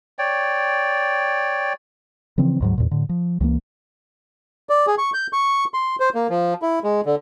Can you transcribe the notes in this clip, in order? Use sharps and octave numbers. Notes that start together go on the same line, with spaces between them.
C#5 D5 G5
C#3 E3 F3 C4
D2 G#2 F#3
E2 A#2
A2 D3
F3
C#2 E3 G#3 A#3
D5
G#4
C#6
G6
C#6
C6
C5
A#3
F3
E4
G#3
D3